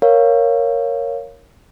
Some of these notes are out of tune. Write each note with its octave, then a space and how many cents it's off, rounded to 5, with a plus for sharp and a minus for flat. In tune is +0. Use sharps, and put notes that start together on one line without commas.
A#4 +0 C#5 +0 F5 +0